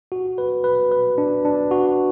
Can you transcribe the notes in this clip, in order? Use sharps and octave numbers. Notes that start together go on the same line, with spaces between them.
F#4
B4
B4
B4
D4
D4
F#4